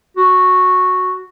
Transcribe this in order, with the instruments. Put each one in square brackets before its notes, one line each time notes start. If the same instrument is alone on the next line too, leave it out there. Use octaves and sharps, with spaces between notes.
[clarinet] F#4